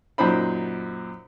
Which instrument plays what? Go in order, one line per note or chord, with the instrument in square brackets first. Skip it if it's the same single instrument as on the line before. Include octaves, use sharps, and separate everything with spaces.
[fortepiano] F#2 A#2 D#4 C5 B5